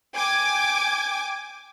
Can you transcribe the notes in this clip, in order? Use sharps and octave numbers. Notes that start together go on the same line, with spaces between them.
G5 G#5 D6 G#6